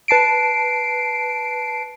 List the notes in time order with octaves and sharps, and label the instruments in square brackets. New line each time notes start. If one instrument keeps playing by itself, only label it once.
[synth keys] B4 A5 C7 D7